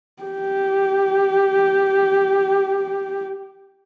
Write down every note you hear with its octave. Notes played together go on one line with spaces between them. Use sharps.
G4